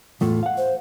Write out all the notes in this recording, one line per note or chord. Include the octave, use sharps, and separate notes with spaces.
E2 A2 A3 F4
F5 F#5
C5